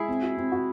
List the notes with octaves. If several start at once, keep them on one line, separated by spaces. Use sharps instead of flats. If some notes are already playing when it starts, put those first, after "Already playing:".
Already playing: G#3 E4 G#4
C4
F#4
C4
F#4